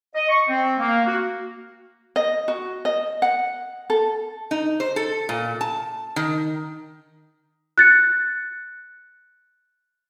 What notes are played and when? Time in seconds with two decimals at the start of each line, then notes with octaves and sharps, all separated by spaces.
0.14 D#5
0.29 C#6
0.48 C4
0.79 A#3
1.06 F#4
2.16 D#5
2.48 F#4
2.85 D#5
3.22 F#5
3.90 A4
4.51 D#4
4.80 C5
4.96 A4
5.29 A#2
5.61 A5
6.16 D#3
7.78 F#6 A6 C#7